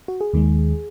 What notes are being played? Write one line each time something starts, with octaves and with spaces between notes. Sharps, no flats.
F#4
G#4
D#2 D#3 G#3